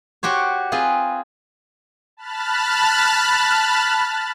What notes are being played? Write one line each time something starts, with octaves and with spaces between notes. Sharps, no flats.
F#4 G4 C5 C#5
C4 F4 G#4 B4
A5 B5 F6 F#6 A6